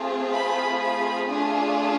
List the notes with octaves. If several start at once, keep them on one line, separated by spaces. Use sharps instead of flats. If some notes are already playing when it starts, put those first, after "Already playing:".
Already playing: A3 C4 F4 G#4
B5
B5
A3 D4 F4 G#4